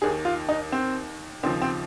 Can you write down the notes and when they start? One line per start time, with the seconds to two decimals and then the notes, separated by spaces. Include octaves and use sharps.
0.02 D#2 D#3 G#4
0.25 F4
0.49 D#4
0.72 C4
1.43 D#2 C#3 F3 C4
1.62 C4